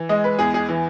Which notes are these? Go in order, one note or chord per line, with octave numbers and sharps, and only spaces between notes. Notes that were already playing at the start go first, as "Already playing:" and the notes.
Already playing: E3
G#3 D#5
B4
E2 G#4
G#4
E3